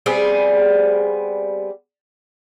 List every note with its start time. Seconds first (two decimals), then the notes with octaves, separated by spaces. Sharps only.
0.06 G3 B3 C4 G#4